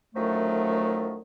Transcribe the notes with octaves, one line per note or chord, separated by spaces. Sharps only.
F#2 D3 D#3 F3 F#3 A3